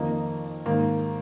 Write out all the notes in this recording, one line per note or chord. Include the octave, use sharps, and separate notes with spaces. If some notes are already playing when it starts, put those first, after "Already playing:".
Already playing: F2 D#3 A#3 D#4
G#2 D#3 A#3